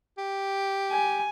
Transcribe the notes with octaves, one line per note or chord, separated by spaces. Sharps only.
G4
G#5